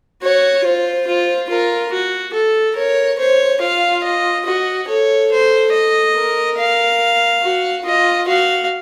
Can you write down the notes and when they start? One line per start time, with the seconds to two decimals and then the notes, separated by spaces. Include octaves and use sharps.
0.22 F#4 C#5
0.64 F4 C5
1.07 F4
1.50 F4 A#4
1.92 F#4
2.34 A4
2.77 A#4 C#5
3.19 C5 C#5
3.61 F4 F5
4.04 D#5
4.46 F#4 D#5
4.88 A4 C#5
5.31 C5
5.73 D#5
6.16 A#4
6.58 F5
7.43 F#4
7.85 F4 D#5
8.27 F#4 F5